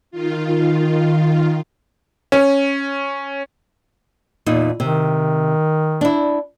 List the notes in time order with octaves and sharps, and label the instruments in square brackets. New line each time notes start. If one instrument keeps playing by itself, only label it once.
[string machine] D#3 F4
[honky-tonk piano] C#4
[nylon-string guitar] E2 A#2 D#4
[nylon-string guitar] C3 [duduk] D#3
[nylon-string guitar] D4 E4